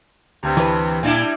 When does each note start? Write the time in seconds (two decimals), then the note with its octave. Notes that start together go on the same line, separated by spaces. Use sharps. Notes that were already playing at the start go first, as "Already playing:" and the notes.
0.44 D2 G2 C3
0.57 E3 B4
1.03 A#2 G3 D4 E4